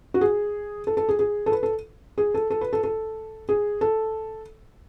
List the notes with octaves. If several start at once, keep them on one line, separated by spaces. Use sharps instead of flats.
F#4
G#4
A4
A4
G#4
G#4
A4
B4
A4
G#4
A4
A4
B4
A4
A4
G#4
A4